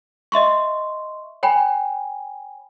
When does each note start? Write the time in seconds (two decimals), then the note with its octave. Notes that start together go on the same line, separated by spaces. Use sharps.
0.32 D#5 E5 C6 C#6
1.43 C#5 G5 G#5 B5